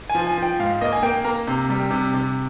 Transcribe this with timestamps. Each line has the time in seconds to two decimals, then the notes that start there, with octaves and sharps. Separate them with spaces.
0.10 G#5
0.15 F3
0.27 G#5
0.38 F3 G5
0.60 G#2 F5
0.81 A#3 D#5
0.92 G#5
1.03 A#3 G5
1.24 A#3 A#5
1.47 C3
1.70 G3
1.90 C3
2.13 C3